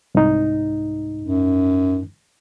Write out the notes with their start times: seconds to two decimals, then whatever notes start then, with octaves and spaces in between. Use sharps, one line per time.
0.15 C2 G#2 D#4
1.22 F#2